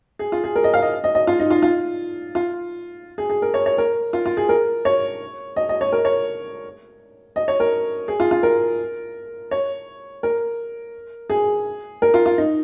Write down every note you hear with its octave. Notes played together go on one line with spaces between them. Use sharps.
G#4
F4
G#4
A#4
D#5
F5
D#5
D#5
D#5
F4
D#4
F4
F4
F4
G#4
G#4
A#4
C#5
C#5
A#4
F4
F4
G#4
A#4
C#5
D#5
D#5
C#5
A#4
C#5
D#5
C#5
A#4
G#4
F4
F4
A#4
C#5
A#4
G#4
A#4
F4
F4
D#4